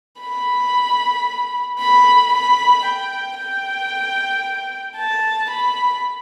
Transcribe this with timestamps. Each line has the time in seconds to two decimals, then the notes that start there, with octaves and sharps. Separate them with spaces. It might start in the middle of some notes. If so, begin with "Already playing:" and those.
0.21 B5
1.79 B5
2.33 B5
2.85 G5
3.38 G5
4.97 A5
5.50 B5